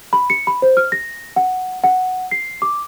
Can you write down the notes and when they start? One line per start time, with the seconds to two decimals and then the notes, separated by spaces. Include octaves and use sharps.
0.13 B5
0.30 C#7
0.47 B5
0.62 C5
0.77 F6
0.92 A#6
1.36 F#5
1.84 F#5
2.31 C7
2.62 D6